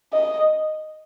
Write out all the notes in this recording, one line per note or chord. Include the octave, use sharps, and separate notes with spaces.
D#5